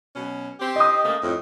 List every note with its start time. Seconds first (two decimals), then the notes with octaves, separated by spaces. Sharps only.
0.15 B2 F#3 C#4
0.60 C4 G4
0.76 D#5 D#6
1.04 C#3 A3 A#3
1.23 F2 A2